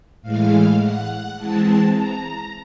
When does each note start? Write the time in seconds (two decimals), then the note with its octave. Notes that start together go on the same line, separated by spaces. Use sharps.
0.22 A2 E3 G#3 F5
0.80 F#5
1.37 E3 G#3 C4 A5
1.94 A#5